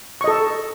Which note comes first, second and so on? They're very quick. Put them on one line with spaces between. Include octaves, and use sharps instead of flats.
C#6 D#5 A4